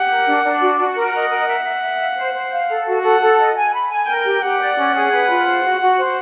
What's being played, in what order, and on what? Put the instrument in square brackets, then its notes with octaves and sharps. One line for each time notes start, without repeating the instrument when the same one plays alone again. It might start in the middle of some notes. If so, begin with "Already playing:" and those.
Already playing: [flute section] G4 [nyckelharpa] F#5
[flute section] A#4
D4
D4
F#4
F#4
[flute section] A#4 [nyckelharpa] F#5
[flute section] D#5
A#4
E5
E5
E5
F5
C5
C5
F5
A4
F#4
[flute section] A4 [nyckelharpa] F#5
[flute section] A4
D#5
G#5
B5
G#5
[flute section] A#4 [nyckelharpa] G5
[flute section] G4
[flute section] G4 [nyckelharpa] F#5
[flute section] D5
C#4
G#4
B4
F4
C5
F#4
F#4
C5